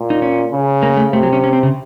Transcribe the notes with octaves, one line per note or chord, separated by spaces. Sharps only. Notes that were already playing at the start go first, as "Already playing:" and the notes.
Already playing: A#2
D#4
C#4
C#3
A#3
A3
C3 A3
F#3
C#4
C#4
C4
C#3